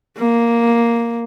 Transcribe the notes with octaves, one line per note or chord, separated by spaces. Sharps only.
A#3